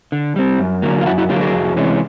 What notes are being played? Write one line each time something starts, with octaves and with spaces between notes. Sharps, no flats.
D3
G3 C4
F#2
D3 F#3 A#3
F4
F#2 E4 F#4
E4 F#4
D3 F#3 A#3 F4 G4
F#4 G#4
F2
C3 E3 G#3 C#4